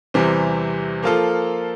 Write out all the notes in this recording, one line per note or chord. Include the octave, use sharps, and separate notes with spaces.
E2 C3 E3 G3 C4
F3 A#3 F4 A4